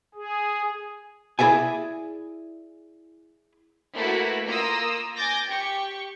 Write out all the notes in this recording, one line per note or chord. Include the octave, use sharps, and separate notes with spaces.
G#4
E4 G#4 D5 E5 G#5
A3 A#3 E4 F#4 B4
A#3 F4 A#5 D#6 E6
G#5 D6 G6 A6 A#6
G4 C#6